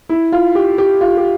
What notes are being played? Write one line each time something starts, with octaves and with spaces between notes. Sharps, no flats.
E4
F4
G4
G4
F4
G4